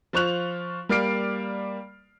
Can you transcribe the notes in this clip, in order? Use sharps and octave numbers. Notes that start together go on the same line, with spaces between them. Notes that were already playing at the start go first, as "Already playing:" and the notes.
F3 F4 C5 C#6 F#6 F7
G3 A#3 D5 F6 C7 D7